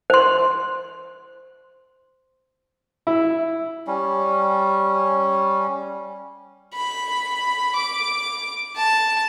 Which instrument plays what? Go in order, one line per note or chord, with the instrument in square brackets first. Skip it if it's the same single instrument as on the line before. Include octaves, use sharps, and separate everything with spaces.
[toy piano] C5 C6
[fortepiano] E4
[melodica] G3 C#4
[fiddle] B5
D6
A5